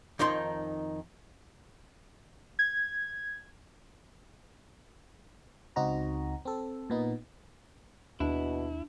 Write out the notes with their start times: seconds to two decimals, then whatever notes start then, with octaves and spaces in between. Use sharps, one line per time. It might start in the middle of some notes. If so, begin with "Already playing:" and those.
0.19 F2 D#3 D#4 C6
2.59 G#6
5.76 C#2 C4 D#4 F#4 A#5
6.45 C4 A4
6.90 A#2 B3 D#4
8.20 D#2 B2 D4 E4